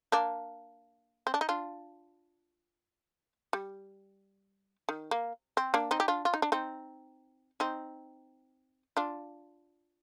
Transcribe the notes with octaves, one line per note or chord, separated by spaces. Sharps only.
A#3 D4
C4
D4
D#4
D4 F4
G3
D#3
A#3
C4
A#3 D4
C4 D#4
G4
D4 F4
F4
D#4
D4
C4 D#4
C4 D#4
D4 F4